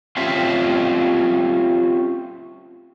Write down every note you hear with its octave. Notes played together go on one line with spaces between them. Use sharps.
C4 C#4 F4 G4 C5 E5